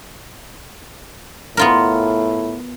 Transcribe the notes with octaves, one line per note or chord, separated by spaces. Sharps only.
A2 B3 F4 A#4